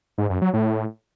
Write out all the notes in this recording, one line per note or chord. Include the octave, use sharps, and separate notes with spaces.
G#2
F#2
F#3
A2